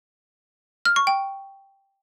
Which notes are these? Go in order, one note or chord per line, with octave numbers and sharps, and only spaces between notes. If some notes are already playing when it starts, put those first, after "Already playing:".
F6
C#6
G5